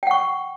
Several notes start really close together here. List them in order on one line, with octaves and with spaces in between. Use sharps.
G5 F#5 C#6